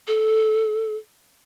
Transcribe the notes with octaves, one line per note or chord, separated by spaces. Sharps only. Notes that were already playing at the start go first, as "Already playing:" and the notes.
A4